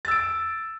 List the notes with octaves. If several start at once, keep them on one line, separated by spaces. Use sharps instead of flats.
E6 A6 D7